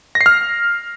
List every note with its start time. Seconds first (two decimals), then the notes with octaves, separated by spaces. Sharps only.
0.15 A#6
0.21 C7
0.26 F6